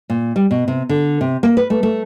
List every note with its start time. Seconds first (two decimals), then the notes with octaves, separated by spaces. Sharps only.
0.10 A#2
0.36 G3
0.51 B2
0.68 C3
0.89 D3
1.21 C3
1.43 A#3
1.57 B4
1.70 A3
1.83 A3